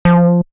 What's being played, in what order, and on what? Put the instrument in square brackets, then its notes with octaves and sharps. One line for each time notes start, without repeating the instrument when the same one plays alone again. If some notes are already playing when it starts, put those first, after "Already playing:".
[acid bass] F3